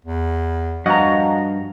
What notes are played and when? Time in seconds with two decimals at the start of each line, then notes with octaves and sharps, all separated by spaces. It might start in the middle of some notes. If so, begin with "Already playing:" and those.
0.05 E2
0.86 G2 F3 F#4 D#5 F5 F#5 A#5